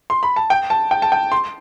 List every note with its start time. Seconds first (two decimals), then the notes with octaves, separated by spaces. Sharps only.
0.10 C6
0.23 B5
0.36 A5
0.50 G5
0.70 A5
0.91 G5
1.02 A5
1.12 G5
1.32 C6